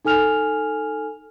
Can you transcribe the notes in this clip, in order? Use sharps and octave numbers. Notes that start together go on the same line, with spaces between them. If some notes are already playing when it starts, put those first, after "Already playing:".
D#4 A4 G#5 F6 F7